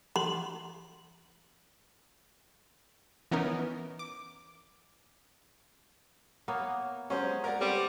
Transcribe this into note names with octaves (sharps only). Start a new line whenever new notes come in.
C6
E3 B3 C#4 D#4 A#4
D6
A#3 B3 C#5
F#3 G#3 C#4 C5
A#4 D5 F#5
G3 C4